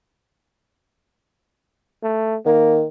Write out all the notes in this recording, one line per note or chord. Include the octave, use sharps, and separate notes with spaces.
A3
D#3 A#3